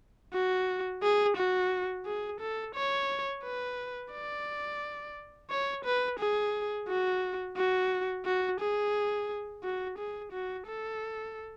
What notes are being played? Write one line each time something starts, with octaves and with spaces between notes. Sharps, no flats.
F#4
G#4
F#4
G#4
A4
C#5
B4
D5
C#5
B4
G#4
F#4
F#4
F#4
G#4
F#4
G#4
F#4
A4